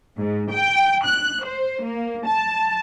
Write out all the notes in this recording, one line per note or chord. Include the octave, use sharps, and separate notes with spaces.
G#2
G5
F#6
C5
A#3
A5